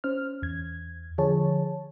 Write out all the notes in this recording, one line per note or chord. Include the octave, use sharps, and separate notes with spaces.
C#4 C5 F6
E2 G#6
D3 F3 G#4 C#5 A5